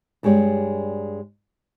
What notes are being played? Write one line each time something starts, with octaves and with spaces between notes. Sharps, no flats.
G2 G#3 G4 C#5 D5